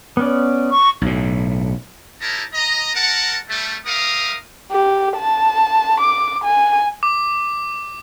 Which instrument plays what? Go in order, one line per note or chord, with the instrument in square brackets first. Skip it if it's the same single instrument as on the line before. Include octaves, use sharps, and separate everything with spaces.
[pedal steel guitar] B3 C#4 D5
[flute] C#6
[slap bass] B1 A2
[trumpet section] D#4 E4 G4 A#4 C#5 A5
D#5 A#5
A#4 F#5 A5
G3 A3
G3 A#4 E5 F5 D#6
[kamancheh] G4
A5
D6
G#5
[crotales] D6